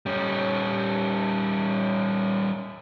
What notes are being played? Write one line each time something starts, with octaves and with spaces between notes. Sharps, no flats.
G3 C#4